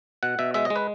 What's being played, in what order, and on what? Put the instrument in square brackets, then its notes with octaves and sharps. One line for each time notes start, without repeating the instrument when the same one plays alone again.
[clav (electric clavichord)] B2 F#5
B2 E5
G#3 E5
D#5
G#3
B4